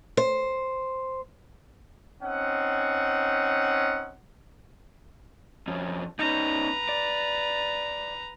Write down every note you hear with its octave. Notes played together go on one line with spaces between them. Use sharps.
C5
C4 C#4 D#4 F#5
F2 C#4
C#4 D#4 B4 A#5
D5